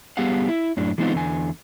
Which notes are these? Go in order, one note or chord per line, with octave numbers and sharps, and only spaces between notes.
G3 B3 G4 G#4 F5 F#5
E4
F#2 A2 D4
E3 G#3 B3 C4 D#4 F4
E2 D3 G#5